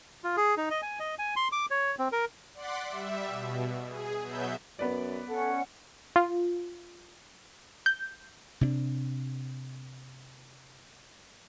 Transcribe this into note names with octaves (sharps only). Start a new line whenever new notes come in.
F4
G#4
D#4
D#5
G#5
D#5
G#5
C6
D6
C#5
C4
A#4
D5 F#5 C6 D6 B6
G3 E5
B2
G#4
B2 F#3 B3 E5 G6
F#2 B3 B4 D5
C#4 A4 F#5
F4
G6
C3 C#4 D4